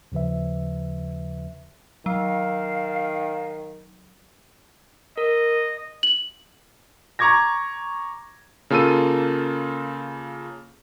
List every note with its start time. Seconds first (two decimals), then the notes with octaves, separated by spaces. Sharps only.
0.12 D#2 C#3 F3 B4 E5
2.06 D#3 F#3 F5
5.18 A#4 D#5
6.03 F#7
7.19 A#5 C#6 D6 G#6 A#6
8.70 C#3 A#3 F4 A4 E6 D#7